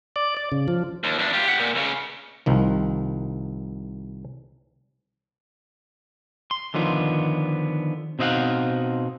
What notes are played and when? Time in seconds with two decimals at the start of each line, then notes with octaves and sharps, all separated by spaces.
0.16 D5
0.37 D5
0.52 C#3
0.68 F3
1.04 D#2
1.19 E2 D4
1.33 F4 G4
1.47 G4 F#5
1.59 A#2
1.75 C#2 C#3
2.46 C2 D#3 F3
6.51 C6
6.74 D3 D#3 F3 B3
8.19 B2 C4 D#4 D#5 F5 F#5